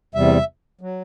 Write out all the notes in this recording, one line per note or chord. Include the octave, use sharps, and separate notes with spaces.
E2 C3 G3 E5
F#3